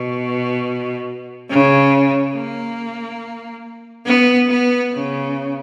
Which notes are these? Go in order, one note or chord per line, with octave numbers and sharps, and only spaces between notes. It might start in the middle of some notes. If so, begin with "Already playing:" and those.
Already playing: B2
C#3
A#3
B3
B3
C#3